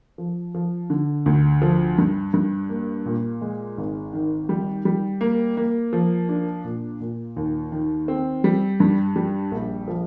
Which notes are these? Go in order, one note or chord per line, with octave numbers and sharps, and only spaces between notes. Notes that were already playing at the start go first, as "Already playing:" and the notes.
F3
F3
D3
D2
F3
G2
G2
A#3
A#2
G#3
G#1
D#3
G3
G3
A#3
A#3
F3
D4
A#2
A#2
D#2
D#3
C4
G3
G2
G3
A#1
F3